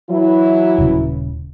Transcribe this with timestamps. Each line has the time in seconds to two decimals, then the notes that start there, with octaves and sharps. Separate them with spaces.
0.10 E3 F#3 E4
0.78 D#1 C#3